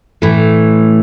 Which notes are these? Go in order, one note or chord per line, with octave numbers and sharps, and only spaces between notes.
A2 E3 A3